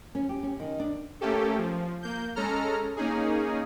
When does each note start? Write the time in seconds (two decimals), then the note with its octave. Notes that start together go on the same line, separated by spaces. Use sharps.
0.15 C#4
0.29 G4
0.43 C#4
0.60 D#3
0.80 D4
1.21 A3 A#3 C#4 G4 A4
1.58 F3
2.03 A#3 G6
2.36 G#3 C#4 A4 A#5 F6
2.97 A#3 C#4 D#4 G#4